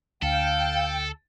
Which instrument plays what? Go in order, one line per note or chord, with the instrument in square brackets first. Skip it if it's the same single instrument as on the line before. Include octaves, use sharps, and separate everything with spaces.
[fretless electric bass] D2 [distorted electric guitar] A4 [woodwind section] F5 [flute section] G5